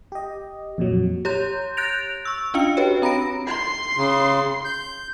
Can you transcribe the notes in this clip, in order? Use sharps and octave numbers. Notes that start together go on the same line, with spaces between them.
G4 D#5
F2 A#2 F#3
G4 C#5 A#5 C6 G6
F#6 G6 A6 A#6 D7 F7
C#6 E6
C#4 D4 F4 D#5 F5 C#7
F#4 G4 B4 C#5 G5
C4 A#5 B5 A#6 D7
C6 C7
C#3
G6